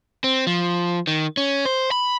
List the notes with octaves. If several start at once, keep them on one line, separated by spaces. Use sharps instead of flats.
C4
F3
D#3
C#4
C5
B5